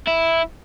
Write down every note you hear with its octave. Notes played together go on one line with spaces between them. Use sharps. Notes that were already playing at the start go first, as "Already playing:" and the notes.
E4